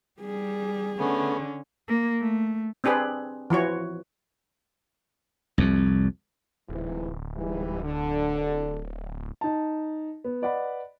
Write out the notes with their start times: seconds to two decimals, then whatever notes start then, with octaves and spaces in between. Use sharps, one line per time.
0.21 G3 G#4
0.99 D3 A3 B3 C#4
1.88 A#3
2.20 A3
2.84 C4 D4 G4 G#4 B4
3.50 E3 F3 F#4 C#5
5.58 C2 F2
6.69 D1 G#2 C3 E3
7.35 G#2 E3 G3
7.83 D3
9.41 D#4 A5
10.24 B3
10.42 B4 D5 D#5 F#5 B5